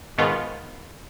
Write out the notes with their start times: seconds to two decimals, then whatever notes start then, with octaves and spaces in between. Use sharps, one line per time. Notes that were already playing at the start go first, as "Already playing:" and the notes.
0.18 G#2 B2 D#3 B3 F4